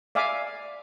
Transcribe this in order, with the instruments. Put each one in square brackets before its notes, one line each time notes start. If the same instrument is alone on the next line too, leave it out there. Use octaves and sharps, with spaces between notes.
[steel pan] D5 E5 F5 G#5 D6